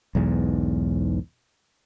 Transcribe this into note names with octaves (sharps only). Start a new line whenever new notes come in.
B1 E2 G#2